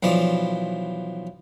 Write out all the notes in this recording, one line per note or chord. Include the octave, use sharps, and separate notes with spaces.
B1 E3 F3 D5